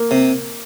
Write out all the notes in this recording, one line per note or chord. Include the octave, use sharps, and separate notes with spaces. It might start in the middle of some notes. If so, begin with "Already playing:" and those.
Already playing: A#3
C3